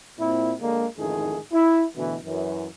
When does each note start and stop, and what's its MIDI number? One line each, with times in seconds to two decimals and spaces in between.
0.18 0.53 46
0.18 0.53 60
0.18 0.53 64
0.60 0.86 50
0.60 0.86 56
0.60 0.86 58
0.98 1.38 33
0.98 1.38 41
0.98 1.38 44
0.98 1.38 51
0.98 1.38 57
0.98 1.38 68
1.52 1.85 64
1.95 2.16 38
1.95 2.16 47
1.95 2.16 52
2.25 2.67 42
2.25 2.67 52